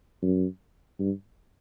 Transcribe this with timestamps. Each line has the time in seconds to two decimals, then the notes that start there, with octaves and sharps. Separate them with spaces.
0.22 F#2
0.99 G2